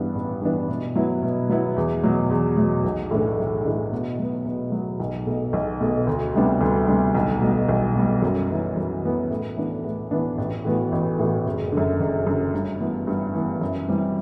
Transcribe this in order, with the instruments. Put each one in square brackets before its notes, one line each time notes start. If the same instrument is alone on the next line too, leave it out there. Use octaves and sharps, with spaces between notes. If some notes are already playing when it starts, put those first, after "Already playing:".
Already playing: [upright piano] A1 G2 E3 B3 D4
A1
G2 E3 B3 D4
B2
F#3 B3 E4
B2
F#3 B3 E4
E2
B2 F#3
E2
B2 F#3
B1
A2 E3 A3 D4
B1
A2 E3 A3 D4
B2
F#3 B3
B2
F#3 B3
B1
B2 A3
B1
B2 A3
D2
C3 G3 B3 D4
D2
C3 G3 B3 D4
B1
B2 G3
B1
B2 G3
F#2
E3 B3
F#2
E3 B3
A2
E3 B3 D4
A2
E3 B3 D4
A1
A2 E3 B3 F#4
A1
A2 E3 B3 F#4
F#1
F#2 D3
F#1
F#2 D3
G2
E3 B3
G2
E3 B3
F#2
E3 G3 C4